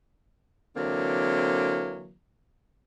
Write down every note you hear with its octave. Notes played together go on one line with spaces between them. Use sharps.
D3 E3 F#3 A#3 C4